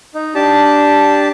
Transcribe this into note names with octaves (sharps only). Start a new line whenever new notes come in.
D#4
D4 G4 A5